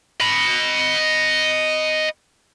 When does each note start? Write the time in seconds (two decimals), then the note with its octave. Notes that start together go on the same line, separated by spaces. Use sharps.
0.20 D#5 B5